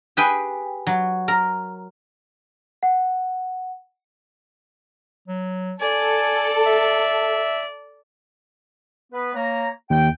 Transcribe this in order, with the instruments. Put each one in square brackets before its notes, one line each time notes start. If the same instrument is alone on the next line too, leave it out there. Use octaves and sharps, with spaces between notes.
[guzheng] G4 G#4 B4 G5 G#5
F#3
A#4 A#5
[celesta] F#5
[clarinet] F#3
[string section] A4 [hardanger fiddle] D5 [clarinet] G#5
[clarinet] E5
[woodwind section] B3 B4
A#3 C#5 A#5
[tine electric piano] D#2 [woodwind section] G5